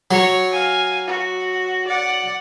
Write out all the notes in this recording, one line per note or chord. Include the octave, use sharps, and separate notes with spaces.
F#3 C#5
F5 G#5
F#4
D5 F#5